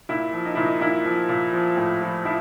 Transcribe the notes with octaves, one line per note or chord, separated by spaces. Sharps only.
A#2 E4
F3
D#4
A#2 E4
D#4
A#2 E4
F3
A#2
F3
A2
F3
F3 E4